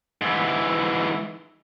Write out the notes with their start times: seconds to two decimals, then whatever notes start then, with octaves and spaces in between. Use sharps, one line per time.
0.21 G#2 E3